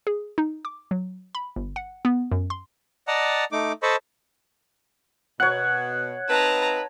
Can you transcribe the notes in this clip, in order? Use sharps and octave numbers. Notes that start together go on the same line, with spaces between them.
G#4
D#4
D6
F#3
B5
G1
F#5
B3
F#2
C6
D5 D#5 F#5 A5 A#5
A3 D#4 D6
A4 C5 D#5 A5 B5 C#6
B2 C#5 F#5 F#6
C4 D#4 B4 A5 A#5